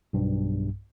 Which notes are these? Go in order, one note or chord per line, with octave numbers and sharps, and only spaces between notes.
B1 G2